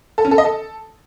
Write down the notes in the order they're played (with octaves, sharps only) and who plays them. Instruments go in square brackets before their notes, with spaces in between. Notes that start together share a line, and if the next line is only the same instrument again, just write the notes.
[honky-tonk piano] A4
C#4
A4
D#5
A4